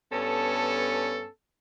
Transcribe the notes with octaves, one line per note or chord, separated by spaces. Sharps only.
G2 B3 C#4 A4